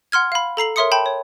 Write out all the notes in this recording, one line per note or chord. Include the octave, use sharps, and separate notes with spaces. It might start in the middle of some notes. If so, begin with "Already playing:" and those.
F#5 C6 F6 G#6
F5 B5
A4 A#5 C7 F#7
A#4 C#5 E5 C6 D#6 C#7
G5 A5 B5 G6
C#5